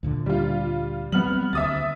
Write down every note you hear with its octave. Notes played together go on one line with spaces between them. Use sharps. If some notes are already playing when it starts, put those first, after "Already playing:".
D2 A#2 D3
G3 F4
F#3 G3 B3 C4 F6 F#7
D2 E5 D#6 A6